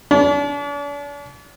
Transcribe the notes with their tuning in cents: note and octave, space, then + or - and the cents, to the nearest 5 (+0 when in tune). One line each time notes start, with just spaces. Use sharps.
D4 -40